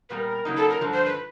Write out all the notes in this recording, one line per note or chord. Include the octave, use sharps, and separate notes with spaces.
A#2 G3 B3 A#4 B4
C#3 F#3 A#3 D#4
A4
A#4
G2 D3 F3
C5
B4